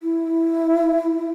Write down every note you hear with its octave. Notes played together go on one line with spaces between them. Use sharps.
E4